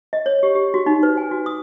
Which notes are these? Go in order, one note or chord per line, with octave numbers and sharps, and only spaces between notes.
D#5
C#5
G4
G4
F#4
D#4
B4
G#5
F#4
D#6